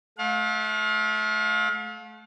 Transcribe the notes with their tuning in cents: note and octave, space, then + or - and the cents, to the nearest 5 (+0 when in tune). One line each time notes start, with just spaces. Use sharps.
A3 -30 F5 +35